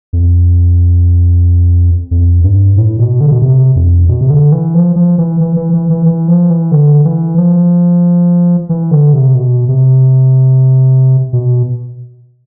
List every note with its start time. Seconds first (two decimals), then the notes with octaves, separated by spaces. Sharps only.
0.13 F2
2.11 F2
2.44 G2
2.76 A2
2.98 B2
3.21 D3
3.32 B2
3.42 C3
3.75 F2
4.08 B2
4.21 C3
4.30 D3
4.52 E3
4.74 F3
4.96 F3
5.18 E3
5.40 E3
5.56 E3
5.73 E3
5.90 E3
6.06 E3
6.28 F3
6.50 E3
6.72 D3
7.05 E3
7.38 F3
8.69 E3
8.91 D3
9.14 C3
9.35 B2
9.68 C3
11.33 B2